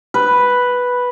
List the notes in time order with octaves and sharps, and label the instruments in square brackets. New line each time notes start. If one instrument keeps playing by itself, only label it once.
[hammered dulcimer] B4